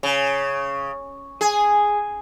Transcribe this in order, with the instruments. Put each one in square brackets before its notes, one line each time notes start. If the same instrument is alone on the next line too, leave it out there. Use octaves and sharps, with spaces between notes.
[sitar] C#3
G#4